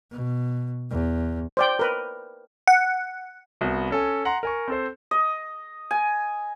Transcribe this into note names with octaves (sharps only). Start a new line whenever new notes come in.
B2
E2
C5 D5 G5
A#4 B4
F#5
C2 B3 F#4
C#4 A4 G#5
F#5 A#5 C6
A#4 G#5 C#6
C4 A4 C5
D#5
G#5